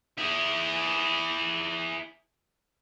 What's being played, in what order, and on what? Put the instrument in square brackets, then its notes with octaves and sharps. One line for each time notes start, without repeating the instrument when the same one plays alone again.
[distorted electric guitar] E4 G#4